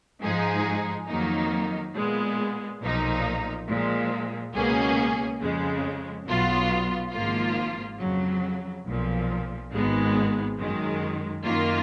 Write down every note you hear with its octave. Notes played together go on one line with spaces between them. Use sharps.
G#2 F3 G#3 D#4 G#4
F2 D#3 F#3 A#3 D#4
A#2 G#3 B3
B1 A#2 F3 A#3 D#4
A#2 F3 G#3
C#2 B2 A#3 C#4 G#4
F2 C#3 G#3
B1 B2 F#3 B3 F4
G#1 G#2 F3 A#3 F4
F2 C#3 F#3
B1 A#2 F3
G#1 G#2 D#3 G#3 B3
F#2 D#3 G#3
F#2 D#3 A#3 F4